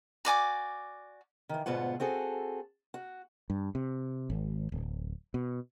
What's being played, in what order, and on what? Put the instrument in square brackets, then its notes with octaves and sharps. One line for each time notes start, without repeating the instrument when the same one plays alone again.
[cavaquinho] F#4 D5 G#5 D6
[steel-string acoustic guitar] D#3 E3
D2 G#2 B2 B3 F4 F#5
C4 F#4 G#4 A4
F#4
[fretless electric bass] G2
C3
G#1
D1
B2